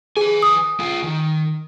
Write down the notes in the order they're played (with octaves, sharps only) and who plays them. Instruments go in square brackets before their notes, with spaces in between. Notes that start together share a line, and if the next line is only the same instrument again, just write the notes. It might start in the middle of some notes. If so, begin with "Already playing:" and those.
[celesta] G#4 [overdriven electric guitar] B4 G#5
[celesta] D#6
[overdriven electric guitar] F4 G#4
D#3